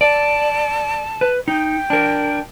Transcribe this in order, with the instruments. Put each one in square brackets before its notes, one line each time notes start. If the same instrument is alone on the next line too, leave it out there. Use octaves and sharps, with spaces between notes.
[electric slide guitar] D5 [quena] A5
[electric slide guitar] B4
[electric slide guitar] D#4 [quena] G5
[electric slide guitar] D4 A#4